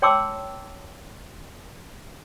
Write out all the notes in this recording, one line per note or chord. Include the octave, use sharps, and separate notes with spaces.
C#5 G5 A5 C6 D6 E6